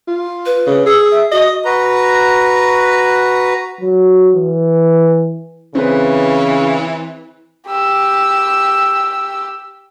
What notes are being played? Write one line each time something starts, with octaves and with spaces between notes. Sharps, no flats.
F4
B4
C#3
G#4 E6
E5
F#4 D#5
F#4 B4 A#5
F#3
E3
C#3 E3 C4 B4
G4 E6